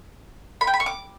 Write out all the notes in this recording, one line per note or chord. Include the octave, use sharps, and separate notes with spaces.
B5
G5
B5
C#6
D6